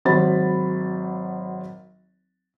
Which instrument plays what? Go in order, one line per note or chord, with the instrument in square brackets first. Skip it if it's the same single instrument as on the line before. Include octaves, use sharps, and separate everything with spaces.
[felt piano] G#1 F#3 C5 B5 A6